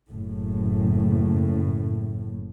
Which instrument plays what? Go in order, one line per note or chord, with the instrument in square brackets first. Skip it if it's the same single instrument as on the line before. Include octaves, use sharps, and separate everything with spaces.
[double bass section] F#1 A2